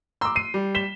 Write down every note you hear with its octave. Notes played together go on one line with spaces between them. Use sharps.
A#5 C6 D6 E6
C7 D#7
G3
B6 E7 G7